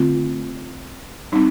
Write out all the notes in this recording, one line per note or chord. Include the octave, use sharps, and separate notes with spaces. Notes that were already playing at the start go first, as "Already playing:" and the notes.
Already playing: D3 A3 C4 F4
G3 C4 D#4